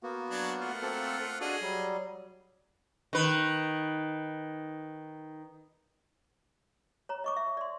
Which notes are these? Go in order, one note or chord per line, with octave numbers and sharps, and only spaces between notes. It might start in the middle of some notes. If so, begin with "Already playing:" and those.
A#3 B3 F#4
F#3 D4
A3 F4 F#5
A#3 C4 A4
D4 F#4 G#4 A4 D#5
F#3 G3
D#3 B4
C#5 A#5
D#5 C#6 D6
E5
D5 C6